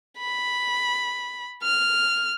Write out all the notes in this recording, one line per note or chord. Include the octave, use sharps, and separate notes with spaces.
B5
F6